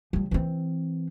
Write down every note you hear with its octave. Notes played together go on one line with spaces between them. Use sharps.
F3 G3
E3 C4